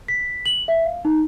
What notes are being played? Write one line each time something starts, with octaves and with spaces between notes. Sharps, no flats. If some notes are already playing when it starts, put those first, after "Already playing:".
B6
F#7
E5
F5
D#4